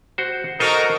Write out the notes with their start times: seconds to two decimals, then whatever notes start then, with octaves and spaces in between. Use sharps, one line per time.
0.18 F#4 C5
0.60 D#4 F#4 A4 A#4 C5 D#5